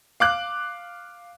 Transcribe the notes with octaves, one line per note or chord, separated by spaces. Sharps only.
F5 D6 F#6